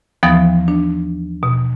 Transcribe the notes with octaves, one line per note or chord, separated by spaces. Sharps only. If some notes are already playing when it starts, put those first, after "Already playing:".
D#2 E3 F3 B3 D#6 A6
D4
B2